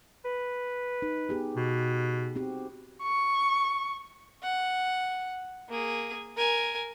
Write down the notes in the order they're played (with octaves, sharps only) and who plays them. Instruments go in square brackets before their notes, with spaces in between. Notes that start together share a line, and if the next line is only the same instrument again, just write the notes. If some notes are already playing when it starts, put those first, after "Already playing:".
[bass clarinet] B4
[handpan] D#4
B3 G4 G#4
[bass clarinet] B2
[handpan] C4 F#4 G4
[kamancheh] C#6
[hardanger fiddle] F#5
A#3 G#4
A#4 G#5